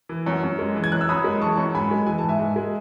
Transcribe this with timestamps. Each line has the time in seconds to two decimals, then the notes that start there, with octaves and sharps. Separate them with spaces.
0.09 E3
0.26 F#2
0.43 F#2
0.59 G#3
0.76 E3
0.84 G#6
0.92 F#2 F#6
1.01 E6
1.09 F#2 B5 D#6
1.24 G#3
1.41 E3 A5 C#6
1.57 F#2
1.74 G#2 G#5 B5
1.91 G#3
2.07 E3 G#5
2.18 G#2 A5
2.29 E5 G#5
2.39 G#2
2.56 G#3